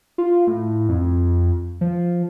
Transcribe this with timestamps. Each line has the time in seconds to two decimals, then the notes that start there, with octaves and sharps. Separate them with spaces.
0.18 F4
0.47 A2
0.89 F2
1.81 F3